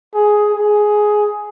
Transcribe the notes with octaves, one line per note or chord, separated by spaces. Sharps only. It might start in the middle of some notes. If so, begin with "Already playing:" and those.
G#4
G#4